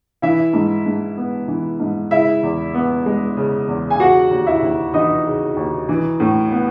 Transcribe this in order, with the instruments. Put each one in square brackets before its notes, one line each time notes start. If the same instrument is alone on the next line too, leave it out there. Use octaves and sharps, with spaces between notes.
[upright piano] E3 E4 E5
G#2
G#2
B3
E3
G#2
C#3 E4 E5
E2
B3
G#3
C#3
E2
G#5
C#3 F#4 F#5
D#2
E4 E5
D#2
E3 D#4 D#5
C#3
D#2
E3
A2
B3